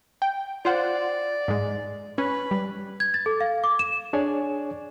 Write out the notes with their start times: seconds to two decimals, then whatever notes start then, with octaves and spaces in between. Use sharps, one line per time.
0.22 G5
0.65 F4 C5 D5 F#5
1.48 G#2 G#3
2.18 C#4 B4
2.51 G3
3.00 G#6
3.14 A6
3.26 A4
3.40 F5
3.64 D6
3.79 E7
4.13 D4 G#4 C#5 D5 G#5